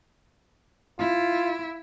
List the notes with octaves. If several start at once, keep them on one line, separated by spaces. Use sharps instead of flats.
E4 F4